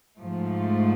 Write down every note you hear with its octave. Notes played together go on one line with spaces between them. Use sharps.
G#2 F3 A3